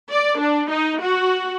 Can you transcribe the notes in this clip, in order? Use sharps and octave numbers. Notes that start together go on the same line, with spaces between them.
D5
D4
D#4
F#4